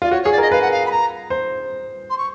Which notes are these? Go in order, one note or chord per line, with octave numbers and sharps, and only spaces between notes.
F4 D5
F#4 C#5
C#5
G#4
D5
A#4
D#5
B4 F5
F#5
F5
B5
A#5
C5
C6
C#6